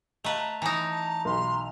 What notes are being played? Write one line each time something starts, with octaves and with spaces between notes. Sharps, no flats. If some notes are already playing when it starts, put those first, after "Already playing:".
A3 B4 D#5 F5 A#5
E3 D#4 B5
A5
B1 B5 C6